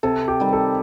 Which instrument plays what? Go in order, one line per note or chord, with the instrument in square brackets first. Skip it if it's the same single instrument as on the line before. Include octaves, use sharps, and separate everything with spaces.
[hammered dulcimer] C3 [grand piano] A4
[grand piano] G4
[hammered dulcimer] D#3 G3
[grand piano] A4